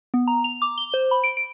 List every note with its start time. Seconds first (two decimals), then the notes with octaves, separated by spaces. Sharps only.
0.14 B3
0.28 A#5
0.44 F7
0.62 D6
0.78 G7
0.94 C5
1.11 B5
1.24 D7
1.37 D7